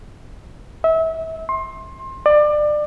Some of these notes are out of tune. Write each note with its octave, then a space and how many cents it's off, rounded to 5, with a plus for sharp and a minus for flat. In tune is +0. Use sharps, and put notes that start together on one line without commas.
E5 -30
C6 +25
D5 +25